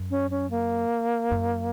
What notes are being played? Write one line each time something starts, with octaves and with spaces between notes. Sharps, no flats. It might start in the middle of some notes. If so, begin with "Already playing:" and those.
Already playing: F#2
C#4
C#4
A#3
F#2